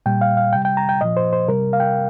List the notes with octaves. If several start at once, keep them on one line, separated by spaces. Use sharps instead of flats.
A#2 G3 G5
F5
F5
C3 G3 G5
G5
A#5
G5
A#2 F3 D#5
C5
C5
C3 G3 A#4
F5
G5